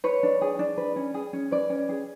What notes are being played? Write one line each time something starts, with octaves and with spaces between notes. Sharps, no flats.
B4 C#5
D4
G#4
D4
B4
C#4
G#4
C#4
B4 D5
C#4
G#4